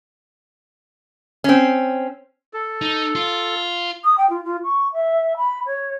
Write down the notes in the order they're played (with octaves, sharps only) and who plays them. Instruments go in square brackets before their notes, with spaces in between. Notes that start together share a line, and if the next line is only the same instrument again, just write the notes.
[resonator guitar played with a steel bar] C4 C#4
[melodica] A4
[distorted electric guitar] D#4
F4
[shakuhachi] D#6
G5
F4
F4
C#6
E5
B5
C#5